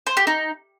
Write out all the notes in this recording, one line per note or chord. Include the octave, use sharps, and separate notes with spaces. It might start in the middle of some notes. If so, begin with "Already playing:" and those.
C5
G4
D#4